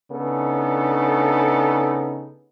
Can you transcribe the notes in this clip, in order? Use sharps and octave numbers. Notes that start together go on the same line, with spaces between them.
C#3 B3 D4 D#4 A4